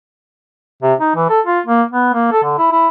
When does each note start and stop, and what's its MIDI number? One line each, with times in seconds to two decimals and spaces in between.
0.82 0.94 48
1.00 1.11 63
1.16 1.29 52
1.30 1.40 69
1.46 1.60 65
1.66 1.83 58
1.91 2.09 59
2.14 2.28 58
2.32 2.42 69
2.43 2.55 50
2.58 2.70 64
2.71 2.88 64